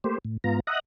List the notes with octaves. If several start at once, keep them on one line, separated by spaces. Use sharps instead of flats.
A3 A#3 G4 C5
A2
G#2 B3 F4 A#5
D#5 E5 F#5 A#5 D#6 F#6